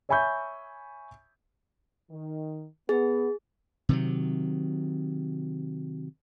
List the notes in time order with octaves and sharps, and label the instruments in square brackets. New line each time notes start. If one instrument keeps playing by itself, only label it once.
[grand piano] C#5 E5 G#5 B5 C#6 G6
[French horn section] D#3
[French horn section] B3 [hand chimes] G#4
[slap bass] C3 D#3 F#3